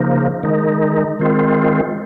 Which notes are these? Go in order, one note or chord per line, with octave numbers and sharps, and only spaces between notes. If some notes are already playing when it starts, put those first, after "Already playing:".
Already playing: C#3 F3 A#3 D#4
D#3 G#3 D#4
D#3 G#3 C4 F4